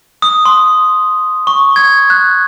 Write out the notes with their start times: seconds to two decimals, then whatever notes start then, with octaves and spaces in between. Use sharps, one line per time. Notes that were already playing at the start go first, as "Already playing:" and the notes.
0.22 D#6
0.45 C6
1.47 C#6
1.76 G#6
2.10 F#6